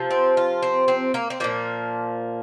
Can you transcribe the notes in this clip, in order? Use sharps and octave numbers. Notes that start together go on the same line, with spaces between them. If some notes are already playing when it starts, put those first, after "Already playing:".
Already playing: C3 F3
C4
F4
C4
C4
A#3
C4
A#2 F3 A#3